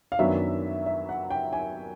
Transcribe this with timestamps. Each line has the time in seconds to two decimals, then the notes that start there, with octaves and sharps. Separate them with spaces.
0.12 F5
0.19 F#2 D#3 F#3 B3 D4 E5
0.86 E5
1.09 F#5
1.30 G5
1.53 G#5